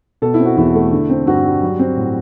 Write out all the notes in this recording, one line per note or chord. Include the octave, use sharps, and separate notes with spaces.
B2 A4
E4
C4
F#4
E2 E4
A3
D3
C4
G2 F#4
G3
F#3
C4
A2